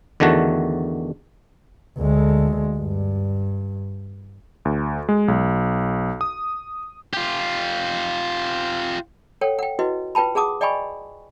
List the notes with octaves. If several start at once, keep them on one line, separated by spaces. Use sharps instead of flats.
E2 D3 D#3 A3 F#4
D2 G#3
G2
D2
G#3
B1
D#6
F4 G4
A4 C#5 F#5 G5
F#5 G5
E4 F#4 B4 D#5
F4 B4 G5 A5 B5
G#4 F#5 A5 D6 D#6
D5 D#5 G5 G#5 B5 C#6